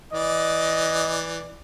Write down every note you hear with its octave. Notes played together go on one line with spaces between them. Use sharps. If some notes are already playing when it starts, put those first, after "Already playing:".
E3 D5 D#5